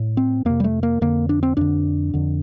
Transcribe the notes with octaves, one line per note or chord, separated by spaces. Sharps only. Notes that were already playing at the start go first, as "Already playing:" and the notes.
Already playing: A2
C4
F2 C3 A#3
G3
A3
A#3
F2 D3 A#3
D4
C4
F2 D3 D4
F2 D3